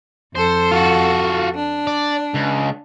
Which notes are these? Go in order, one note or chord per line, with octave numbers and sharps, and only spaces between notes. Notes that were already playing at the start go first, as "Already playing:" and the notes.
F2 A4 C5
F4 F#4
D4
D5
C#2